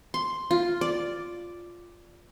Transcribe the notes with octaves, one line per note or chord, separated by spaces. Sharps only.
C6
F4
D5